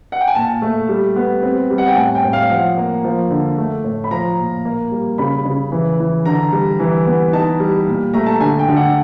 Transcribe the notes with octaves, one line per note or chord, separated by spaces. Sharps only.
F#5
G5
G#5
A#2 A5
A3
G3
B3
C4
G3
F#5
G5
A2 G#5
G5
A2
F5
F3 F#5
A#3
F3
D3
A3
A2
B5
F3 A#5
A#2
A#3
G3
C#3 B5
C#3
E3
E3
D3 A#5
G3
E3
B3
D#4 A5
G3
A#2
A3 A#5
A5
D3 G#5
G5
D3
F#5